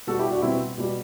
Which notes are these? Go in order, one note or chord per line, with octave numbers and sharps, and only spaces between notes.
B2 G3 F#4 A4
E4 G4
D4 F#4
B2 G3 C4 E4
B2 G3